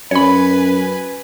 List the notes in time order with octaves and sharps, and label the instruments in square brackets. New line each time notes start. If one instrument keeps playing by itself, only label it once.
[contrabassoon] F#2 [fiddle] B4 G#5 [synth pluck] C#5 B5